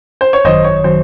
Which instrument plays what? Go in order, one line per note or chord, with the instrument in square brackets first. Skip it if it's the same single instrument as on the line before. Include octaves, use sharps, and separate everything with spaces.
[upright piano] C5
C#5
[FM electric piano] G#1 F#2 D#3 F#3 [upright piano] C5 D#5
[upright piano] C#5
[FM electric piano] D#3 F#3 [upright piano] C5